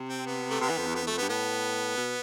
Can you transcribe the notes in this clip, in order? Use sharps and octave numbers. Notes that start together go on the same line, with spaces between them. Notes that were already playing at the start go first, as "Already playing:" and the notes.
Already playing: C3
C4
B3
A3
C3 B3
E3
F2
E2
F2 B3
E2 A3
F2
B3
G2
A2 B3
B2